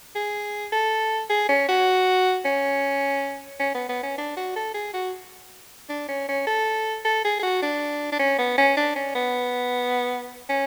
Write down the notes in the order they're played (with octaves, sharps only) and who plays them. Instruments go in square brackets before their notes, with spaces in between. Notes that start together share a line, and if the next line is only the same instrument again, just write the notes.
[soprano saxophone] G#4
A4
G#4
C#4
F#4
C#4
C#4
B3
B3
C#4
D4
F#4
A4
G#4
F#4
D4
C#4
C#4
A4
A4
G#4
G#4
F#4
D4
D4
C#4
B3
C#4
D4
C#4
B3
C#4